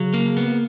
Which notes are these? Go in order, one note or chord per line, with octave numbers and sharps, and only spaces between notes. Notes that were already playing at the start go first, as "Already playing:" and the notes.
Already playing: C#3 F#3
A#3
B3